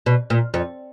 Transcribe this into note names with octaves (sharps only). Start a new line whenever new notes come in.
B2
A#2
F2